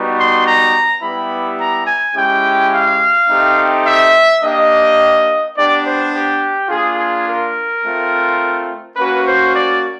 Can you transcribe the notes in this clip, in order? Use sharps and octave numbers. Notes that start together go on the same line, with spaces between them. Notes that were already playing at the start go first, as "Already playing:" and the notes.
Already playing: G3 B3 D#4 F#4
C6
A#5
G3 B3 E4 G4 B5
A#5
G#5
G#3 C#4 E4 G4 G5
F5
A3 C4 D#4 G4
E5
A#3 D4 G4 D#5
B3 D4 G4 D5
C5
G4
A#3 D4 F4 G#4
G#4
A#4
A3 C4 F4
A#3 C#4 F#4 B4
C5
D5